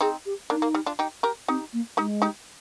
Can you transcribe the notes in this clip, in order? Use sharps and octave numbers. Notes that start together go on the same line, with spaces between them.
C4 D#4 G#4
G4
A#3 D4 D#4
A#3
G3
D4 F4
D#4 G4
G4 A#4
C4 D#4 G4
A#3
G#3 D#4 G4
D#4 G4